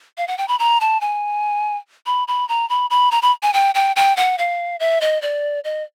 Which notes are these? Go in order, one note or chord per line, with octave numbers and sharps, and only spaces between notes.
F5
F#5
G5
B5
A#5
A5
G#5
B5
B5
A#5
B5
B5
A#5
B5
G#5
G5
G5
G5
F#5
F5
E5
D#5
D5
D#5